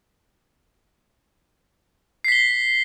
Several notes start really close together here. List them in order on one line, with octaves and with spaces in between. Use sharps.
C7 B6 G7